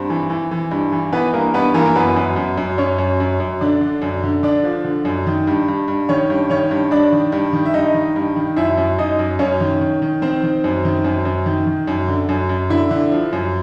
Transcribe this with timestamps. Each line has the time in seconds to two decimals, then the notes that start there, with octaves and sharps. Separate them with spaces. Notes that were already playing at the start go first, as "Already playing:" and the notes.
Already playing: G2 C4 C5
0.10 E3
0.30 E3
0.51 E3
0.71 G2
0.92 E3
1.13 E3 B3 B4
1.33 G2 A#3 A#4
1.54 G2 B3 B4
1.74 E3 A#3 A#4
1.86 A#4
1.95 F#2 B3 B4
2.16 F#2
2.36 F#2
2.57 F#2
2.78 F#2 C#4 C#5
2.98 F#2
3.20 F#2
3.40 F#2
3.61 D3 D4 D5
3.81 D3
4.02 F#2
4.23 D3
4.43 D3 D4 D5
4.64 F3
4.84 D3
5.05 F#2
5.27 D#3
5.47 G2
5.68 G2
5.88 G2
6.09 D#3 C#4 C#5
6.30 G2
6.50 D#3 C#4 C#5
6.71 G2
6.91 G2 D4 D5
7.12 D#3
7.32 G2
7.53 D#3
7.65 E5
7.74 G2 D#4 D#5
7.94 D#3
8.16 G2
8.36 D#3
8.56 F#2 E4 E5
8.78 F#2
8.98 F#2 D#4 D#5
9.19 F#2
9.39 F#2 C#4 C#5
9.60 D#3
9.81 D#3
10.02 D#3
10.22 D#3 C4 C5
10.43 D#3
10.64 F#2
10.85 D#3
11.04 F#2
11.25 F#2
11.46 D#3
11.67 D#3
11.87 F#2
12.08 D3
12.29 F#2
12.49 F#2
12.70 D3 E4 E5
12.91 D3
13.12 F3
13.33 F#2